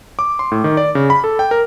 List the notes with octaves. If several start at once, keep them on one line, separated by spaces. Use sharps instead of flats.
D6
C6
A2
D#3
D5
C#3
B5
A4
G5
A#4